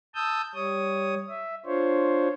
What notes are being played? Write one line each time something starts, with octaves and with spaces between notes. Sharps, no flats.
A5 D#6 E6 G6
G3 C#5 D#6
E5
D4 F4 C5 C#5